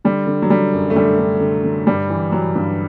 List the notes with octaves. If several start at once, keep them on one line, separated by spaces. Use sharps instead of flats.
D3 G3
D3
F#3
D3 G3
F#2
A3
D3 G3
D3
D3
D3
G2 G3
E3
E3 F#3
G2